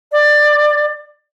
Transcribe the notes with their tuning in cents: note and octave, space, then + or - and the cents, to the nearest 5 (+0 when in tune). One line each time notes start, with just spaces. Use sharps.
D5 +20